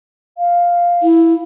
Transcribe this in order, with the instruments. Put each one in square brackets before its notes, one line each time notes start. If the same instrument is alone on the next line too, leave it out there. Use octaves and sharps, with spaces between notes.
[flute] F5
[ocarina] E4